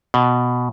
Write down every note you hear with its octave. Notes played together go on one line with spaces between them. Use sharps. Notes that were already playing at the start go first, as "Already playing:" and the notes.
B2